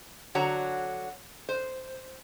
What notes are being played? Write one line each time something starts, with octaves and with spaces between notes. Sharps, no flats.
D3 F#3 F#4 C#5 A#5
C5